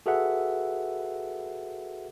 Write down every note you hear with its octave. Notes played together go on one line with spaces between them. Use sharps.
F#4 G#4 A4 B4 E5 F#5